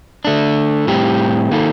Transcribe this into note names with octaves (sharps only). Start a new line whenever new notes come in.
D3 A3 D4
A2 G3 C4 G4
D#3 A#3 D#4 A4